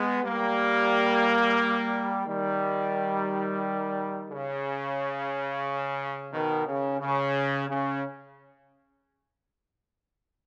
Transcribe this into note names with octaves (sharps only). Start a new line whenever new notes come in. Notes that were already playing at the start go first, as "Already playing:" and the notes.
Already playing: G#3 B3
G3 A#3
D#3 G3
C#3
B2 D#3
C#3
C#3
C#3